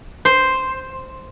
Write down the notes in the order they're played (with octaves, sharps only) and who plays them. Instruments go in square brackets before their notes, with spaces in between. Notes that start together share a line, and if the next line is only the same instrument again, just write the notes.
[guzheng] C5